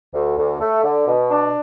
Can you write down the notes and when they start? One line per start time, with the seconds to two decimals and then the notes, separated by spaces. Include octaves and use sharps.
0.14 D2
0.38 D2
0.61 A3
0.84 D3
1.07 B2
1.31 D4